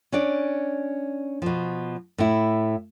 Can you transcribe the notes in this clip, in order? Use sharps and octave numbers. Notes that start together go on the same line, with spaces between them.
C#4 D4 D5
B2 F3
A2 E4